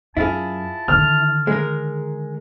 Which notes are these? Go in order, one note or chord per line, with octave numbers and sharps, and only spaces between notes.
F#2 E4 F4 G#4 A5
D3 D#3 F6
G#3 A#4